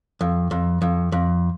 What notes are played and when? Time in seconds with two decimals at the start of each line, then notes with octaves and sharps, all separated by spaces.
0.21 F2
0.51 F2
0.82 F2
1.12 F2